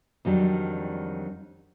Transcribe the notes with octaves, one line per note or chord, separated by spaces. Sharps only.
F2 D#3 F#3 G3 D4